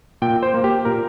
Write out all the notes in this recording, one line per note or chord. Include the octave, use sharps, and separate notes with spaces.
A#2 G5
C5
A#3
G4
A#2 A#4